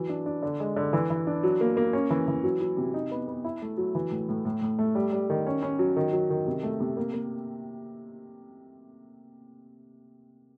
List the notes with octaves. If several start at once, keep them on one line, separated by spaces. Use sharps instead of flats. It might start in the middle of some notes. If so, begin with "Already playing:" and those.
Already playing: E3 F#3
D4
D4
D3
G#3
D3
E3
E3
D4
F#3
A#3
A#3
C#4
E3
E3
F#3
F#3
C3
D#4
B3
B3
E4
A3
F#3
E3
A2
A2
A2
A2
A3
G3
G3
D#3
C#4
C#4
F#3
D#3
F#3
D#3
C3
A3
C3
A#3
A#3